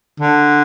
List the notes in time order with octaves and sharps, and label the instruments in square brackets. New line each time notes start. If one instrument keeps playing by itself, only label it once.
[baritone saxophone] D3